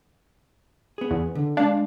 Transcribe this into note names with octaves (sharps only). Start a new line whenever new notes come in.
B3 G#4
E2
D3
G#3 D4 F5